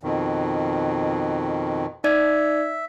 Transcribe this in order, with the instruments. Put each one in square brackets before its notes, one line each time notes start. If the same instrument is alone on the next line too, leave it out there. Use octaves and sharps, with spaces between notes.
[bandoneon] F2 B2 D#3
[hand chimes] D#4 D5 G#6 [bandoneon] E5